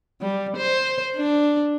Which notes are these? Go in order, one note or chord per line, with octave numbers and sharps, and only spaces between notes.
G3
C5
D4